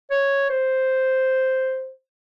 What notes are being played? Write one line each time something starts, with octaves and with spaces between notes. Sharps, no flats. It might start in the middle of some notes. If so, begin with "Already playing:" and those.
C#5
C5